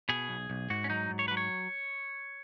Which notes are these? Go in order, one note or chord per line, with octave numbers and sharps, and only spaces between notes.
B2 G#4
B1
B1
G#2 F#4
C#4
F#3 D#4
G#2
C#5
F#3 B4
C#5